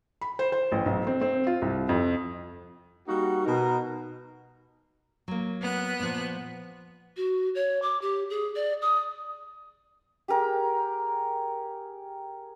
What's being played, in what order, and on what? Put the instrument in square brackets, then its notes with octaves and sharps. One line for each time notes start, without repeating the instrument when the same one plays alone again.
[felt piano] B5
C5
C5
A1
B1
C4
C4
F4
C2
F2
[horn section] G3 A#3 D#4 F#4
B2 D#4 A#4
[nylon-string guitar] F#3 A#3
[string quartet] B3 F#6
[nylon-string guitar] A#2 F3
[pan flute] F#4
C#5
D6
G4
G#4
D5
D#6
[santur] G4 G#4 A#4 G5